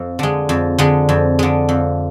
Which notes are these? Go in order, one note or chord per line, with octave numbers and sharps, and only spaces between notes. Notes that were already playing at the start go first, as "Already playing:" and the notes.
Already playing: F2
D3 G#3
F2
D3 G#3
F2
D3 G#3
F2